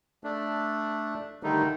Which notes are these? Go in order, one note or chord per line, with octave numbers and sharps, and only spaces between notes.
A3 D4
D3 D#3 G3 A3 D#4